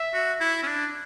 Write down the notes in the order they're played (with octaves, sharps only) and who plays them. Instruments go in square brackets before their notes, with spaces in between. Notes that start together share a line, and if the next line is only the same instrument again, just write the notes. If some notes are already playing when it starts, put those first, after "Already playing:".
Already playing: [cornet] E5
[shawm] F#4
E4
C#4
D4